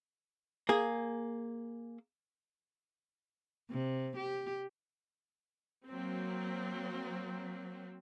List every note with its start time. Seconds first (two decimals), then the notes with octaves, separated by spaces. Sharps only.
0.69 A#3 G#4
3.71 C3
4.16 G4
5.88 F#3 A#3 C4